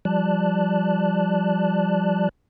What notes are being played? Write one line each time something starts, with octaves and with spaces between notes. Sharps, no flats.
F3 G3 D5 A5 F#6